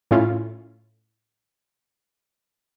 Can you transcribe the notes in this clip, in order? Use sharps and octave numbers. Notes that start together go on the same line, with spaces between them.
A2 A3 C#4 E4 F4